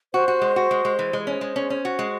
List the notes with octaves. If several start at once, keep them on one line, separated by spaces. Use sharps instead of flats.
F#4 C5
F#4
G#3
F#4
G#3
G#3
E3
G#3
C#4 C5
G#3
C#4
C#4
F#4
G#3